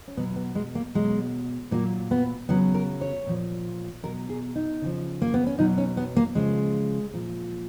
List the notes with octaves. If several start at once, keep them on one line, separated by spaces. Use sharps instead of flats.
C#4
B2 F#3 B3
B3
G#3
A#3
B2 F#3 G#3
A#2 F#3 A#3
B3
C#3 F#3 B3
A#4
C#5
A#2 F3
B2 F#3 A#4
G#4
D#4
C#3 F3
A#3
B3
C#4
B2 F#3 D#4
C#4
B3
A#3
C#3 F3 G#3
A#2 F3